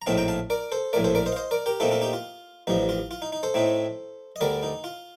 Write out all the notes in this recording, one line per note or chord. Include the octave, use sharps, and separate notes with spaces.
A#5
A#1 A2 A3 C4 D#4 F5 A5
G5 A#5
F5 A5
A#4 D5
A4 C5
A#1 A2 A3 A#4 D5
A4 C5
A#4 D5
C5 D#5
F5
C5 D#5
A#4 D5
G4 A#4
A#2 A3 C4 D#4 F4 A4
F4 A4
D#4 G4
F4
A1 G2 F3 D#4
F4
F4
D#4
D#4
A4 C5
A2 A3 C4 D#4
D#5
D2 D3 G3 A#4 D5
D#4
F4